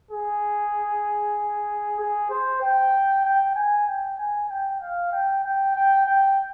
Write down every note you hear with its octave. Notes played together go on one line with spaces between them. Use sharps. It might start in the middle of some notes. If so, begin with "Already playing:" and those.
G#4
G#4
C5
G5
G5
G#5
G5
G#5
G5
F5
G5
G5
G5
G5